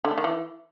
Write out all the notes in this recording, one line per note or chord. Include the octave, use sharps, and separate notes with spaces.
D3
A3
D#3
E3